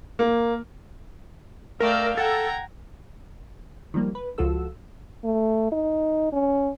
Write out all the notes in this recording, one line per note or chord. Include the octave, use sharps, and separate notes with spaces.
A#3
A3 A#4 D5 F5 G5 E6
A4 F#5 G5 A#5 G#6
D#3 F3 G3 A#3
B4
C#2 F3 F4 F#4 A4 E6
A3
D#4
C#4